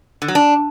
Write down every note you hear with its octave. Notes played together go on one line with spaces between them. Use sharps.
D3
F#3
D4